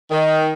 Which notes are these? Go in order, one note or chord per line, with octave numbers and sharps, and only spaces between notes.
D#3